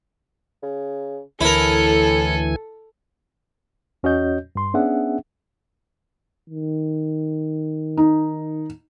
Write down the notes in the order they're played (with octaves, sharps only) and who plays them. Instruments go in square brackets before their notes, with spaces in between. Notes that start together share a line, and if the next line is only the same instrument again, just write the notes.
[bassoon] C#3
[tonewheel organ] D2 E3 G#5 [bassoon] A2 [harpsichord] E4 A#4 [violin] A4
[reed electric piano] E2 C#4 F#4 C#5 D#5 G6
G2 C6
B3 C#4 D4 G#4 E5 F#5
[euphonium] D#3
[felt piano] D#4